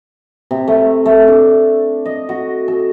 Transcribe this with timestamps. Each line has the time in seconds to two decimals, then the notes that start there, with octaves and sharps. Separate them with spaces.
0.51 C3
0.68 A3
1.06 A3
1.28 D4
2.06 D#5
2.29 F#4
2.68 A4